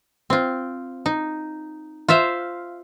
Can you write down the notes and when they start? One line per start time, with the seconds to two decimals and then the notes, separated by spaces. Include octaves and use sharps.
0.30 C4 F4
1.06 D#4
2.08 F4 C5 E5 F5